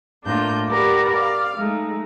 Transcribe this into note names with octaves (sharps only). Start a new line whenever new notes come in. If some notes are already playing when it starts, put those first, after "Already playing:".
A2 A#3 D4 F4 G6
G4 A#4 D5 F#5 B5
D5 F5
G#3 A3 D#4